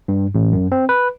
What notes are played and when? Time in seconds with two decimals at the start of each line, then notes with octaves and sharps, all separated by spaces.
0.08 G2
0.35 A1
0.53 F#2
0.72 C4
0.89 B4